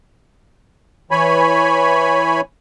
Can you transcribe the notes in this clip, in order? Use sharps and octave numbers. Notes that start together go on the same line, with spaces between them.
E3 C#5 G#5 B5